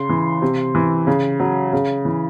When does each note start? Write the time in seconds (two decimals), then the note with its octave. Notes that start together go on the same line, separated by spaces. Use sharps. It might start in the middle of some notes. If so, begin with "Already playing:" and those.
Already playing: C#3 C6
0.09 E3
0.42 C3
0.75 E3
1.07 C#3
1.40 F#3
1.73 C#3
2.05 E3